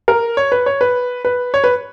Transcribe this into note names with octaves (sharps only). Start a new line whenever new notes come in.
A#4
C#5
B4
C#5
B4
B4
C#5
B4